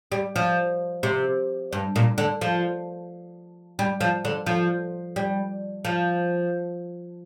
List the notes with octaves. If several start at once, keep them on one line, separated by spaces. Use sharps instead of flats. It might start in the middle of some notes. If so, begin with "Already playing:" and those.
G3
F3
C3
G2
A#2
D3
F3
G3
F3
D3
F3
G3
F3